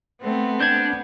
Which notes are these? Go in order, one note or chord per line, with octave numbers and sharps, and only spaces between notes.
A3 B3 C4
D4 G6 G#6